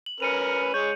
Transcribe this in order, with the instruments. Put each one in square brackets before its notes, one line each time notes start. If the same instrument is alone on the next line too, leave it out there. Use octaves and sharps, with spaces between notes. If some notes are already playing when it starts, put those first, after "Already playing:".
[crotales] F#7
[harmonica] C#4 A#4 B4 [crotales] C#7 D#7 F7
[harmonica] G#3 C#5 [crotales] G6